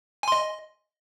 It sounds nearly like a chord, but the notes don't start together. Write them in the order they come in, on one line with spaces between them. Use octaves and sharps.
G#5 C6 D#5